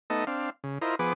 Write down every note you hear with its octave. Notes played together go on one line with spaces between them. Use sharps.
A3 B3 D#4 D#5 A5
C4 D4 F5
C#3
E4 F4 A#4 C5 D#5
F3 B3 G#4 B4 D6